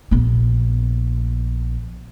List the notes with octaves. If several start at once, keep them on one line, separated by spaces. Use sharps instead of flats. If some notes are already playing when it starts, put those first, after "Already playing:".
A#1 B3